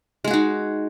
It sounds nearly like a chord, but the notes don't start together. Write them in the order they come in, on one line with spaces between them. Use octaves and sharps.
G#3 G#4 F#4 D#4